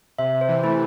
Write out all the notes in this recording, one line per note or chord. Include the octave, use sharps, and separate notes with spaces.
C3 E5
C3
C5
E3
A3 E4